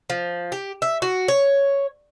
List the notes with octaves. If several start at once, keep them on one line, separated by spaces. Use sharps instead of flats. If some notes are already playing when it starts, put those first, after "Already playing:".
F3
G4
E5
F#4
C#5